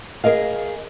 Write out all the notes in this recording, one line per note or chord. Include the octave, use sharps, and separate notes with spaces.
G#4 A#4 D#5 F5